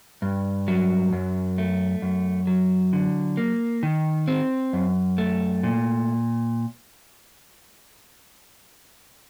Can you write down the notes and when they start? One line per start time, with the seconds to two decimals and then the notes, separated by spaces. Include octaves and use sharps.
0.22 G2
0.68 F#3
1.13 F#2
1.58 A3
2.02 F#2
2.47 F#3
2.93 D3
3.37 A#3
3.83 D#3
4.28 C4
4.73 F#2
5.18 A3
5.63 A#2